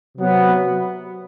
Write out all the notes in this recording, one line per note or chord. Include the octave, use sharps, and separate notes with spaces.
C3 F#3 B3